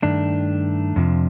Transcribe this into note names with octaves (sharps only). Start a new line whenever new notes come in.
G2 D#3 A3 D4
F2 C3 F3